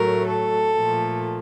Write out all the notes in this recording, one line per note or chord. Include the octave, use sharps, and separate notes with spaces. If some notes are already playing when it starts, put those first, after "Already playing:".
Already playing: A2 F#3 A3 A#4
A4
A#2 F3 A3